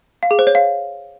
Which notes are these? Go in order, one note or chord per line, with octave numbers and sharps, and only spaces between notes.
F5
G#4
C5
C#5
F5